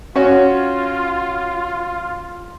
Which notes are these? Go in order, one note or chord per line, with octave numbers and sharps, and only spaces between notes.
C#4 F4 F#4 C#5